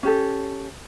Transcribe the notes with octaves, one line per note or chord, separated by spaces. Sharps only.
C#4 G4 A4